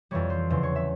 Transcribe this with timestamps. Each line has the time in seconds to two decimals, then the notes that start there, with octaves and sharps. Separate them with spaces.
0.11 F2 E3 G3 C#5
0.30 C5
0.50 E2 C#3 F3 C5
0.63 C#5
0.75 E5